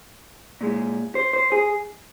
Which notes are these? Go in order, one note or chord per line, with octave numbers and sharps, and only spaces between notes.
A#2 G#3
C5
C5
G#4